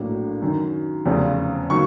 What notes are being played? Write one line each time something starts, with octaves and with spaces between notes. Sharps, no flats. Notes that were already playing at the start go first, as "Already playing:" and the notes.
Already playing: A#1 A2 F#3 A#3 D4
F#2 D#3 F#3
F1 E2 C#3 F3
D#3 F#3 A#3 C#6